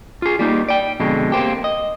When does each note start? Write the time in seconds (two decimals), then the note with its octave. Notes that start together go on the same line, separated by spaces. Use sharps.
0.22 F4 G#4
0.39 G3 A#3 D#4
0.69 D5 G5
1.00 F2 B2 D3 G#3
1.32 A#3 C4 G4
1.64 D#5